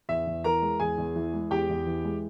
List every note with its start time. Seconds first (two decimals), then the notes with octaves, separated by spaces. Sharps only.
0.09 E2 E5
0.27 E2
0.44 E3 A#4 A#5
0.62 G#3
0.80 E2 G#4 G#5
0.98 E2
1.16 E3
1.34 G#3
1.51 E2 G4 G5
1.69 E2
1.86 E3
2.04 G#3